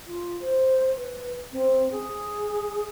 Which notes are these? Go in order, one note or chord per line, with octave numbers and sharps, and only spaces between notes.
F4
C5
B4
C4
G#4